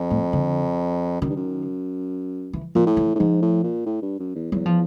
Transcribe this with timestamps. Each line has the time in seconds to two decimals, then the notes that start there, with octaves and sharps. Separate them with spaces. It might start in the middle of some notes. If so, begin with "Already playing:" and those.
Already playing: F2
0.11 A2
0.33 D3
1.21 F#2 D#3
1.29 G2
1.36 F#2
2.53 E3
2.75 A#2 F3
2.86 A2
2.97 E3
3.15 A2
3.19 G#2 F3
3.42 A2
3.63 A#2
3.86 A2
4.02 G2
4.19 F#2
4.35 E2
4.52 E2 F#3
4.66 F3